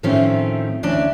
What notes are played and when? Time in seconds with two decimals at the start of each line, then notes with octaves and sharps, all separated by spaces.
0.03 A2 D#3 F3 A3 C4 C#4
0.83 D2 E3 C#4 D4 D5 A5